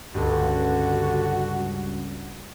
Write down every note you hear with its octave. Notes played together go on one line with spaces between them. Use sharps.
C#2 G2 D3 F#4